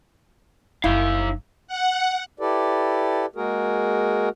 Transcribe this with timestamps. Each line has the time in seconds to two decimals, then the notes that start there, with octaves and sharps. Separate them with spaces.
0.84 F#1 F3 D#4 E4 F5
1.67 F#5
2.40 E4 G4 A4 B4 D5
3.36 G#3 A#3 F#4 G#4 A#4